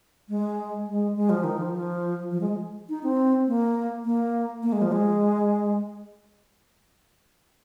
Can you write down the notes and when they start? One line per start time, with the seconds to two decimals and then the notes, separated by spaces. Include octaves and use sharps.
0.29 G#3
0.87 G#3
1.16 G#3
1.30 F3
1.44 D#3
1.58 F3
1.73 F3
2.31 F3
2.41 G#3
2.89 D#4
3.03 C4
3.48 A#3
4.05 A#3
4.63 A#3
4.72 G#3
4.82 F3
4.92 G#3